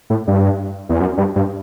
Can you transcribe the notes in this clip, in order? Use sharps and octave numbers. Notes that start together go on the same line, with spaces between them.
A2
G2
E2
F#2
G2
G2